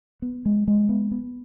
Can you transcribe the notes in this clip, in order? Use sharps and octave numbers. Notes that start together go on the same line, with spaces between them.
B3
G#3
G#3
B3
B3